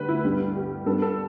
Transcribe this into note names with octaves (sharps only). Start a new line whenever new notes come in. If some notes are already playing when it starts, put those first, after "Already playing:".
Already playing: D2 D3 G3 B3 B4
E4
G2 D3 G3 B3
G4
G2 G3 B3 A4
A4